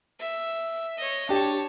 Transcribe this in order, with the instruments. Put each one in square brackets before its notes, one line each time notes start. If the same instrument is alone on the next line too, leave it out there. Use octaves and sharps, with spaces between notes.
[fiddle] E5
C#5 D#5
[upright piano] D4 G4 [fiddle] C#5 A5